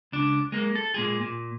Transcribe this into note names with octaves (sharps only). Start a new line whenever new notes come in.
C#2 D4
G#3 A#3
A4
A#2 G#3 G#4
A#2